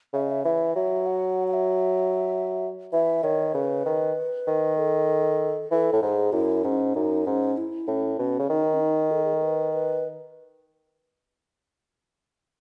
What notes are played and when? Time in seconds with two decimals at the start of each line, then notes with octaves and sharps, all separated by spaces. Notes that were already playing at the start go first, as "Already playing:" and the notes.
0.13 C#3 E5
0.21 D#5
0.30 E5
0.45 E3 E5
0.75 F#3 E5
1.06 F#5
1.48 F#5
1.53 E5
2.92 E3 E5
3.23 D#3 C#5
3.54 C#3 B4
3.85 D#3
4.47 D#3
4.78 A4
5.71 E3 A4
5.93 A2
6.02 G#2 G#4
6.32 F#2 E4
6.64 G#2 C#4
6.94 F#2 D#4
7.26 G#2 C#4
7.57 E4
7.88 A2 C#4
8.19 B2 C#4
8.39 C#3
8.49 D#3 D#4
8.74 C#4
8.80 D#4
9.11 A4
9.24 G#4
9.34 A4
9.43 B4
9.73 B4